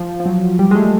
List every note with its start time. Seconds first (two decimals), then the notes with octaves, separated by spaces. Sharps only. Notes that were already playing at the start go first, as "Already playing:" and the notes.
Already playing: F3
0.20 F3
0.26 F#3
0.59 G3
0.71 G#3
0.75 A3